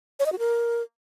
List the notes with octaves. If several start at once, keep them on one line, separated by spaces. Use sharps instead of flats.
C#5
D#5
F#4
A#4